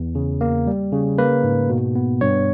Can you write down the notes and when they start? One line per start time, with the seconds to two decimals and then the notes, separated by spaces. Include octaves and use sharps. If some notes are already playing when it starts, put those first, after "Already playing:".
Already playing: E2
0.15 C#3
0.41 A#3
0.67 G3
0.92 C#3
1.18 A#3 B4
1.44 G#2
1.70 B2
1.95 B3
2.21 G2 C#5